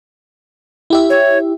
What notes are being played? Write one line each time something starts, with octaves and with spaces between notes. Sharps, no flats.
E4 G4 E5
C#5